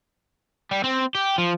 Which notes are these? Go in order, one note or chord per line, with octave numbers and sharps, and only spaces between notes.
G3
C4
G4
F3